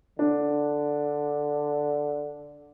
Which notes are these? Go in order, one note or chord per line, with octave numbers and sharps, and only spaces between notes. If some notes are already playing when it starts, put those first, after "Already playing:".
D3 D4